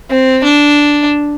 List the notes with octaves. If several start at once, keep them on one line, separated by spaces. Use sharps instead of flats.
C4
D4